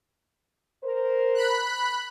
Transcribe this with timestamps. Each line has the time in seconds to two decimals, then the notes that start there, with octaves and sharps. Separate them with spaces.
0.84 A#4 C5
1.35 B5 F#6